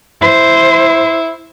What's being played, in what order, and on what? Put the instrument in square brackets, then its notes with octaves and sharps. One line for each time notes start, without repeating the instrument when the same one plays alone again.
[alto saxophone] E4 [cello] C5